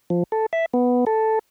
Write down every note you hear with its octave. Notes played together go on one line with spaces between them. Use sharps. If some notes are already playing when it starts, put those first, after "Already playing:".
F3
A4
E5
B3
A4